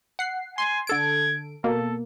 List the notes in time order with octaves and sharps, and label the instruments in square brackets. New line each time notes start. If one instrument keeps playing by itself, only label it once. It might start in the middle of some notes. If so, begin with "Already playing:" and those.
[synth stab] F#5 C7
[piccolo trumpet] G#5 [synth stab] C6
[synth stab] D3 A4 D7 [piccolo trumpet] G#6
[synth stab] B2 A#3 [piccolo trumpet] A4